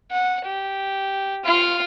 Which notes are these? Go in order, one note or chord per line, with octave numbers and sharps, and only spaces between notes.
F#5
G4
F4 F5